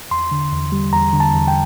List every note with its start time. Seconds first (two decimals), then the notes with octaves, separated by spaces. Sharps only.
0.11 E2 C6
0.31 D3
0.53 E2
0.72 G3
0.93 E2 A#5
1.13 D3
1.20 A5
1.34 E2
1.48 G5